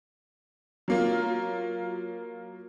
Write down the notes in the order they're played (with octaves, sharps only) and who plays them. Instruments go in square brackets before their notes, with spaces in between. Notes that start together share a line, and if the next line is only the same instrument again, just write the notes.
[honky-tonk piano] F#3 A#3 F4